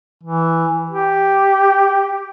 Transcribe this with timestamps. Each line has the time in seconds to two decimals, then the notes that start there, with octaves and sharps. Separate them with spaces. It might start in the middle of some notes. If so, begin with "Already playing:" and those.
0.23 E3
0.90 G4